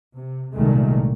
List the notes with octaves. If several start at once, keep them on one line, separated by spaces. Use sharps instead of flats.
C3
C2 A#2 D#3 G#3 A3